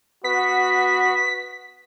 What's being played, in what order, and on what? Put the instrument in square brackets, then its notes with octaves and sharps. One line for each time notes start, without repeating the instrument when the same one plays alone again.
[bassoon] B3 [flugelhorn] F#4 [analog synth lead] B6